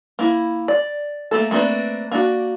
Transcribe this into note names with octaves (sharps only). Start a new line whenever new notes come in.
A#3 E4
D5
A3 A#3 A4
A3 A#3 C4 D4 B4
A#3 D4 F#4